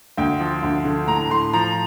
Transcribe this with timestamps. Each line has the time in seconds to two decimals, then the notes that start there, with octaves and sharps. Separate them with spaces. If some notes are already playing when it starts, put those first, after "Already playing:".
0.17 D2 G5
0.40 F3
0.62 D2
0.85 D3
1.07 A2 A#5
1.30 A2 C6
1.53 F3 A#5